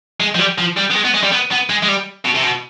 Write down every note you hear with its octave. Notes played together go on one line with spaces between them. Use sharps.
G#3
F3
G3
F3
G3
B3
G#3
B3
G#3
G3
B3
B3
G#3
G#3
G3
B2
C3
B2